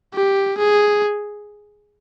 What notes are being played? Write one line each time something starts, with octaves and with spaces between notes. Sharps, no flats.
G4
G#4